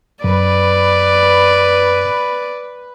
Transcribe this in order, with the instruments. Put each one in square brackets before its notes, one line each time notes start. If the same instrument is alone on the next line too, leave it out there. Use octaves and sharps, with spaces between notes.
[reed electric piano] F#2 [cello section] B4 [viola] D5